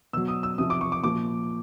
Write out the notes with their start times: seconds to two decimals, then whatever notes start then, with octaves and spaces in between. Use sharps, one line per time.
0.13 B2 F#3 E6
0.28 D#6
0.43 E6
0.58 C3 F3 D#6
0.70 D6
0.81 C#6
0.92 D6
1.03 A#2 F3 D6